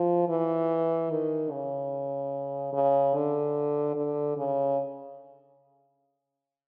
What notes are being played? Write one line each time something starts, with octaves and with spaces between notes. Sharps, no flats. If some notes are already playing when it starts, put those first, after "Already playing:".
Already playing: F3
E3
D#3
C#3
C#3
D3
D3
C#3